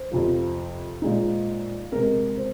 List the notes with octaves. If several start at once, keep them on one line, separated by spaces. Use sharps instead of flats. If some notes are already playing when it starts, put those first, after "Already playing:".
Already playing: C5
F2 C3 F3
A#2 G#3 D#4
C3 G#3 C4 A#4
C5